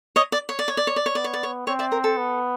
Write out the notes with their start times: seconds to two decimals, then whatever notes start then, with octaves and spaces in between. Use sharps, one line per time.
0.16 C#5 D#5
0.32 D5
0.49 C#5
0.59 D5
0.68 C#5
0.77 D5
0.87 C#5
0.96 D5
1.06 C#5
1.15 B3 D5
1.24 C#5
1.34 D5
1.43 C#5
1.67 C4 C#5
1.79 D5 E5
1.92 A#4
2.04 A4
2.17 B3